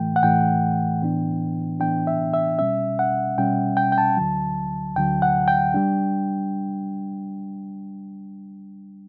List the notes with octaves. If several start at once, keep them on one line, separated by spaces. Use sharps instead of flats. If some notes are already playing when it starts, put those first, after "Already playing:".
Already playing: A2 E3 A3 G5
F#5
A2 E3 A3 G5
A2 E3 B3 D4
A2 E3 B3 D4 G5
E5
E5
B2 G3 C#4 E5
F#5
B2 G3 C#4 G5
G5
G5
A5
D2 D3 F#3
D2 D3 F#3 G5
F#5
G5
G3 D4